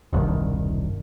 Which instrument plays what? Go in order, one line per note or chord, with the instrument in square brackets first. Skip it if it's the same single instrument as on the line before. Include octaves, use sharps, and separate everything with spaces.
[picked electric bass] E1 C2 G2 D#3